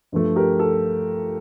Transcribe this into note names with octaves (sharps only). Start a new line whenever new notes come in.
G2 F3 A3
G4 A#4
A4